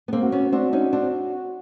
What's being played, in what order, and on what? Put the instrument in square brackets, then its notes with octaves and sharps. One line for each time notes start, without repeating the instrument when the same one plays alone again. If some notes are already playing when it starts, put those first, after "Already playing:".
[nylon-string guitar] B3
A#3 C4
[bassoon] F#4
[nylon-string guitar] B3 C#4
[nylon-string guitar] C4 D4 [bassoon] F#4
[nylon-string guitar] C#4 D#4
C4 D4